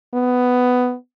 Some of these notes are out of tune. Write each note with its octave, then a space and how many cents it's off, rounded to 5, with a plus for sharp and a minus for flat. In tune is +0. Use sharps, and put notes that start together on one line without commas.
B3 +10